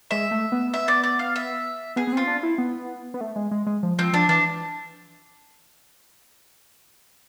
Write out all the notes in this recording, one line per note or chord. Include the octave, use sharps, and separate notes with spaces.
G#3 E5
A3
B3
E5
D5
D5
F5
E5
B3 G#4
B3
C4 F4
D4
E4
B3
B3
A3
G#3
G#3
G#3
F3
F3 C4
F3 D4
E3 D4